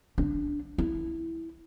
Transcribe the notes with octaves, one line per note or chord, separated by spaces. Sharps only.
D4
E4